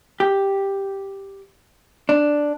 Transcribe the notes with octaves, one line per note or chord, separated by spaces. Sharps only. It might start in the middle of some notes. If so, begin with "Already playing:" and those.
G4
D4